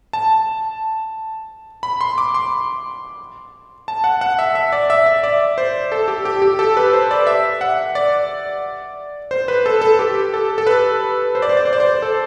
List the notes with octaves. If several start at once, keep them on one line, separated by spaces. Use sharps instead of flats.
A5
B5
C6
D6
C6
A5
F#5
F#5
E5
E5
D5
E5
E5
D5
C5
A4
G4
G4
G4
A4
B4
C5
D5
E5
F#5
D5
C5
B4
A4
A4
G4
A4
A4
B4
C5
D5
C5
D5
C5
D5
C5
A4